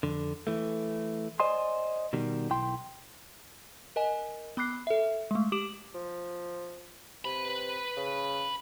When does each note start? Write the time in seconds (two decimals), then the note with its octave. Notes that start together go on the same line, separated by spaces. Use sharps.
0.03 F2 D3
0.47 E3 A3
1.40 C5 D5 D#5 G#5 C6
2.13 B2 D#3 G3
2.50 B1 E4 G5 C6
3.96 A#4 D#5 G#5
4.57 B3 B5 D6 F#6 C7
4.87 A4 E5
5.31 G#3 A3
5.52 G4 D6 D7 E7 F#7
5.95 F3
7.25 C3 B4 B5
7.96 C#3